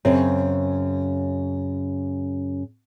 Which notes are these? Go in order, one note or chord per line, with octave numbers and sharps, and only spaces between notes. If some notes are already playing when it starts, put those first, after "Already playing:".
F#2 C#3 C4